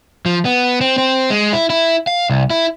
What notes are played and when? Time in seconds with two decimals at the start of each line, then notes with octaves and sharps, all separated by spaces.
0.26 F3
0.45 B3
0.81 C4
0.98 C4
1.30 G#3
1.53 E4
1.70 E4
2.07 F5
2.30 C2
2.50 E4